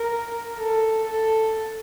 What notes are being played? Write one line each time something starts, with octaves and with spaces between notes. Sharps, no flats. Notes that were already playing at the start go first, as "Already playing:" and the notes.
Already playing: A#4
A4
A4